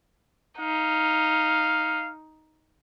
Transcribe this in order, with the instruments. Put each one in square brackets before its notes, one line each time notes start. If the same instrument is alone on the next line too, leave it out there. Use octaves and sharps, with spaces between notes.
[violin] D#4 [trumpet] F5